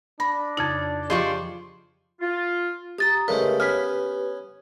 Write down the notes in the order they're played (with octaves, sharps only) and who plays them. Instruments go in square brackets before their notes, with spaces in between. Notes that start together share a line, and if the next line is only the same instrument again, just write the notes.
[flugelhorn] D4 [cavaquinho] B5 [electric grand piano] A#6
[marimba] F2 C#3 D#4 [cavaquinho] A4
[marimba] F3 D#5 [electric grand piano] F4 G4 G#4 [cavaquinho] C5 D5 C#6
[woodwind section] F4
[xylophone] G4 A6 [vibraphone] A#5 D#6
[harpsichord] C#3 G#3 A3 [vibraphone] G4 B4 [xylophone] A#4
[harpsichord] B3 C#4 G#5 [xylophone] F6 B6